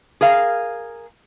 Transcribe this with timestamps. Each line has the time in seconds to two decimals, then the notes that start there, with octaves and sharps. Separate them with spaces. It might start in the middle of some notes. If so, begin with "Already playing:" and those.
0.21 G#4 A#4 F5